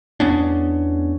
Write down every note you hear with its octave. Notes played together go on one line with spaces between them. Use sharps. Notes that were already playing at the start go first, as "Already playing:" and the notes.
E2 B3 C#4 D4